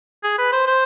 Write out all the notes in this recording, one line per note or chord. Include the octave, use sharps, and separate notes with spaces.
G#4
B4
C5
C5